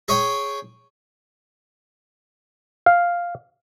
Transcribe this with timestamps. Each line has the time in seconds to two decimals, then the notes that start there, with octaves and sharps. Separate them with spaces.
0.08 G#4 C#5 G5
2.86 F5